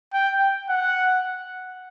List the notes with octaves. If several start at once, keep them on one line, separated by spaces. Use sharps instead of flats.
G5
F#5